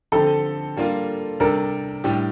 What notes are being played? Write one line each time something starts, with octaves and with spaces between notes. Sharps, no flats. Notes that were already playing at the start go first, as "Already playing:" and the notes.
D3 F3 C4 G4 A4
G3 A#3 D4 F4
C3 G3 D4 A4 A#4
A2 G3 D4 G4